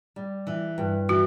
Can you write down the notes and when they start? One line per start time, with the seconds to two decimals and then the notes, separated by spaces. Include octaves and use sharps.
0.16 G3
0.47 E3
0.78 G2
1.09 E3 F#4